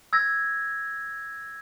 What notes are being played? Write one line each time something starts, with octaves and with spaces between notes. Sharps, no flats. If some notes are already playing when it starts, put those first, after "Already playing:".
E6 G#6 A#6